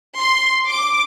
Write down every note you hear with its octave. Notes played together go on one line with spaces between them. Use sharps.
C6
D6